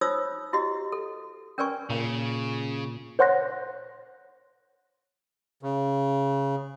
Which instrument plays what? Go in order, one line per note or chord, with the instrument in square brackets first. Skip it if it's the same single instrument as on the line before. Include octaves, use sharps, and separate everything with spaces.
[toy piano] D#4 F4 C5 C#5 D#6 E6
E4 F#4 G4 D#5
A4
C#4 A#4 B4 D5 G#5 C#6
[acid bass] A#2 [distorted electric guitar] C#3
[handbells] C5 C#5 F#5 C6 F#6 A#6
[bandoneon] C#3